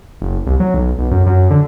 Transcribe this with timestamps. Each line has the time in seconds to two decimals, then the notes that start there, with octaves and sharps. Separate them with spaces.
0.22 F#1
0.46 C2
0.60 F#3
0.74 B1
0.99 B1
1.11 F#2
1.27 F#2
1.51 D3